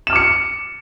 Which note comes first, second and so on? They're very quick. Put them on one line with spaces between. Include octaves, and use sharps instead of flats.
E7 F6 D6 C#7